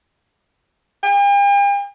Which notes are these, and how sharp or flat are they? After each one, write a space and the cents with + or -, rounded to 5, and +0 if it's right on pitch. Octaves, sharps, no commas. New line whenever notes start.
G5 +45